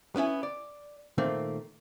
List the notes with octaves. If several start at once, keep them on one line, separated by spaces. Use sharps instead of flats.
B3 C#4 E4 G#5
D5
A#2 D#3 A3 A#3 C4